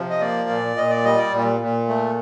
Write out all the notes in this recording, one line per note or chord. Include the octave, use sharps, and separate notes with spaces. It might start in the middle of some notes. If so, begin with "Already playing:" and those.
Already playing: C3 F3
D#5
A#3 D5
A#2
A#2 D#5
D5
G3 D#5
D5
A#2
A#2
A3